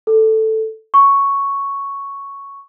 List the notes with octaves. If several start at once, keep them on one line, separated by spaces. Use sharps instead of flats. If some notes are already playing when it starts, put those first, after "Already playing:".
A4
C#6